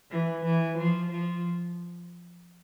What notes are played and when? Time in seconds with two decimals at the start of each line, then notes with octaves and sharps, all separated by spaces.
0.11 E3
0.44 E3
0.78 F3
1.12 F3